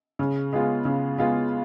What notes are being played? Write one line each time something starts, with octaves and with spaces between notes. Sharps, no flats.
C#3
G#3 B3 F4
C#3
G#3 B3 F4